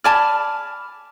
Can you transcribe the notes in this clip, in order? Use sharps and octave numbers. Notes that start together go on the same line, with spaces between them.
D5 G#5 A5 B5 D6 F6